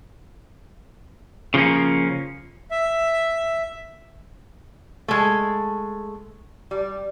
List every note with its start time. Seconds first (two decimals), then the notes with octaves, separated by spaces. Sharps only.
1.54 C#3 F3 G3 A#3 C#4
2.71 E5
5.08 G#3 A3
6.71 G3